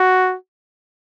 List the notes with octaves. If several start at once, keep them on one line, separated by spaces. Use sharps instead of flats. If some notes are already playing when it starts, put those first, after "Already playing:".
Already playing: F#4